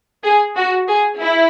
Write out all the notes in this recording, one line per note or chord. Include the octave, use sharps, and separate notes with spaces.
G#4
F#4
G#4
E4